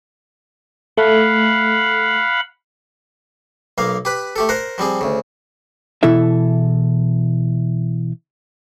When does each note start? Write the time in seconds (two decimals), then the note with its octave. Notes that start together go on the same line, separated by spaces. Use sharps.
0.97 A3 F5 F#5 B5
3.78 B1 A#3 F5
4.05 G4 B4 B5
4.36 A3 G4 A4
4.49 A#4 C5 F#5
4.78 F3 G3 C4 G#4
5.01 D2 C#3
6.03 B2 E3 E4 A4 E5